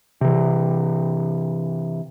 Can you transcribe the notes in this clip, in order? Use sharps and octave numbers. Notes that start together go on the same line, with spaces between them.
C3 E3